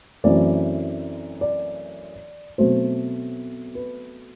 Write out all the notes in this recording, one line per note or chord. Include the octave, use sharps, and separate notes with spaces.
F#2 E3 A3 C4 D5
D5
B2 F#3 A3 C4 C5
B4